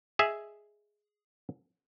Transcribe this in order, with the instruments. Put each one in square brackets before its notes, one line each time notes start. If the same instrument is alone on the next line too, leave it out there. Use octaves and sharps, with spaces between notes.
[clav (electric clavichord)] G#4 D#5 E5